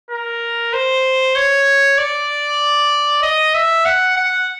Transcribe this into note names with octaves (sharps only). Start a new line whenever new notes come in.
A#4
C5
C#5
D5
D#5
E5
F#5
F#5